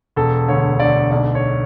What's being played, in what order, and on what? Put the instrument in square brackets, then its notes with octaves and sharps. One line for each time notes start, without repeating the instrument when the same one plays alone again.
[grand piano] E1 A4
D2 C#5
D2 D5
B1 D5
C#5